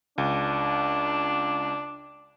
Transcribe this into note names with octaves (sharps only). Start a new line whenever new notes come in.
C#2 D4